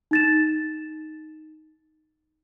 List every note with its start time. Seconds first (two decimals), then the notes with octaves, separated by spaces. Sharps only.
0.11 D#4 A6 E7